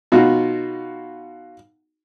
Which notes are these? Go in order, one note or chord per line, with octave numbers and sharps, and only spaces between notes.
B2 D#4 F4 F#4